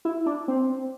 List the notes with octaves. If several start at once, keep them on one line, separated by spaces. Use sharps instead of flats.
E4
D4
C4